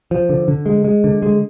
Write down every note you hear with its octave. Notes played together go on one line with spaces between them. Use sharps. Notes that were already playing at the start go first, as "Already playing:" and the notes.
F3
D3
D3
G#3
G#3
D3
G#3